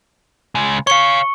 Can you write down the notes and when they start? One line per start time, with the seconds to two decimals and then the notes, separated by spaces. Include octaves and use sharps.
0.55 C#3 G#3
0.87 C#5 F5 C#6 C#7